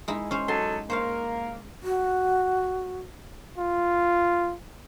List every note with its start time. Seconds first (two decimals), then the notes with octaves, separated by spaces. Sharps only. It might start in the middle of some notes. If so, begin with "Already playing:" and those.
0.08 G#3 D#4 E4
0.31 C#4 C5
0.48 F#3 D#4 A4 C6
0.90 A#3 C5 C#5 F5
1.83 F#4
3.58 F4